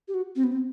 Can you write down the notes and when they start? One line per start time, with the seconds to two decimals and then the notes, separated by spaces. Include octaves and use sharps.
0.08 G4
0.14 F#4
0.36 C4
0.44 B3
0.52 C4